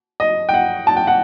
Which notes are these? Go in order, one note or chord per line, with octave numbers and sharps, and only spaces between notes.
D#5
G5
F#5
A5
G5
F#5